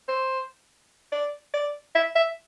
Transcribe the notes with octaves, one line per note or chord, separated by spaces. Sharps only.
C5
D5
D5
E5
E5